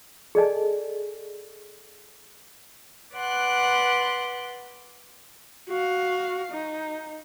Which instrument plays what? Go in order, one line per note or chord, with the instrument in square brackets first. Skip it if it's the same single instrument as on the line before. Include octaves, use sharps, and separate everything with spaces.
[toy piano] G#4 A4 D5 D#5 G#5 A5
[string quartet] B4 D5 F#5 C6 F#6
[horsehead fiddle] F#4 F5
D#4